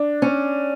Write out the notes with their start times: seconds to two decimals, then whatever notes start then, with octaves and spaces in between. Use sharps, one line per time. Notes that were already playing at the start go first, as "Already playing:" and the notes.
Already playing: D4
0.22 C#4